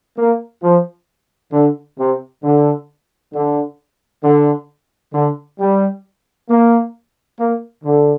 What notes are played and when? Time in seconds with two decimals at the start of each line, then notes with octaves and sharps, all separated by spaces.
0.18 A#3
0.63 F3
1.53 D3
1.98 C3
2.44 D3
3.33 D3
4.24 D3
5.14 D3
5.59 G3
6.49 A#3
7.40 A#3
7.84 D3